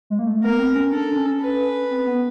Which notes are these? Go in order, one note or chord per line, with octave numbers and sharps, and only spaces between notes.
G#3
A#3
A3
B3 A#4
C4
C#4
D4 A4
D4
C#4
B4
C4
B3